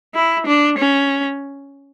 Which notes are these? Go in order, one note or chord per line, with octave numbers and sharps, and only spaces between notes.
E4
D4
C#4